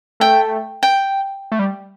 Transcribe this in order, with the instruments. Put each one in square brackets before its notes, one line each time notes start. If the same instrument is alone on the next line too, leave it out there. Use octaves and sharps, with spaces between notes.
[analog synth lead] A3 [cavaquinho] G5
[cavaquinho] G5
[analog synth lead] A3
G3